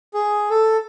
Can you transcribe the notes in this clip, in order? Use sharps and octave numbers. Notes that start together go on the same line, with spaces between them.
G#4
A4